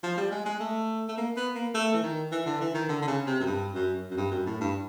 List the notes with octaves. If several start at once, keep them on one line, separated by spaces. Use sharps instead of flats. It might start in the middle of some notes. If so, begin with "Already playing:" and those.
F3
G3
G#3
G#3
A3
A3
A#3
B3
A#3
A3
E3
D#3
E3
D3
E3
D#3
D3
D3
C#3
C3
F#2
G2
F#2
F#2
G2
F#2
A2
G2